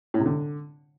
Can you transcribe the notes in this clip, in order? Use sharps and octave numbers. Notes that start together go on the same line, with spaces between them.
A2
C3
D3